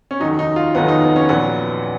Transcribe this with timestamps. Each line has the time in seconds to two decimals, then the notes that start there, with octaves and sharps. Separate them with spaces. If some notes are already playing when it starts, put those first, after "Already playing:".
0.11 C#4
0.20 F1 D#2 D#3 F#3 D#4
0.39 D#4
0.56 F4
0.75 F1 D#2 D#3 F#3 B3
0.88 D#4
1.04 B3
1.16 C#4
1.29 A#1 A#2 F#3 B3